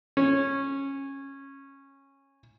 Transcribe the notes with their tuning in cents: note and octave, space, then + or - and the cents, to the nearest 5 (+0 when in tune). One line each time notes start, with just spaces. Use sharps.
C#4 -15